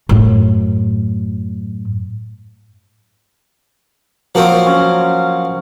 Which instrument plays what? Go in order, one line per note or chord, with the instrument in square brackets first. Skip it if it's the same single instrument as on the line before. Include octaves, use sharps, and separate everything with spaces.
[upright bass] F#2 A2
[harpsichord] F3 A#3 C4 [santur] F#3 C#5
[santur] C#4